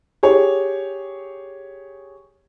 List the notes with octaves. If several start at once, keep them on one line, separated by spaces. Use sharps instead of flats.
G4 G#4 C#5